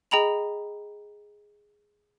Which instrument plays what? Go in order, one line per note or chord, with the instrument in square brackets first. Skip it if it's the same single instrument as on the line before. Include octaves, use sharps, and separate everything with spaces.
[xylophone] G#4 D#5 G5 A#5 B5 F7